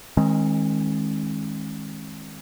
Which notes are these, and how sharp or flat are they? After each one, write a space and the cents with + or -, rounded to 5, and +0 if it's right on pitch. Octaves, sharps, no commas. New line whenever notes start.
D#3 +15 G#3 +0 C#4 -45